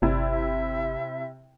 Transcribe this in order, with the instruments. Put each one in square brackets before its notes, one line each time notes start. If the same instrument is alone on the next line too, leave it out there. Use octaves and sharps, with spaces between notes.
[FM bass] G1 [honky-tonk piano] C3 E4 [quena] D5
[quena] E5